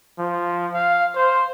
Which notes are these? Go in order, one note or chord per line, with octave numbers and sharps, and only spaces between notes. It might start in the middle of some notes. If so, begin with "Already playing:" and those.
F3
F5
C5